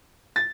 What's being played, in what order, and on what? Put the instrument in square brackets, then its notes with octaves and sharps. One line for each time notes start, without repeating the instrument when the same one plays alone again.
[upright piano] A6